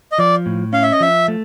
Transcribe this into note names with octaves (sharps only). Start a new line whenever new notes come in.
D#5
F3 D5
A2
C#4 F5
E5
D#5
F3 E5
A3